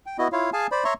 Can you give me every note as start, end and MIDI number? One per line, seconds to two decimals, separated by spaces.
0.06 0.17 79
0.18 0.28 59
0.18 0.28 64
0.18 0.28 66
0.18 0.28 75
0.32 0.50 64
0.32 0.50 65
0.32 0.50 73
0.32 0.50 77
0.53 0.67 68
0.53 0.67 77
0.53 0.67 80
0.53 0.67 81
0.72 0.84 72
0.72 0.84 74
0.72 0.84 83
0.84 0.94 73
0.84 0.94 76
0.84 0.94 82
0.84 0.94 84
0.84 0.94 85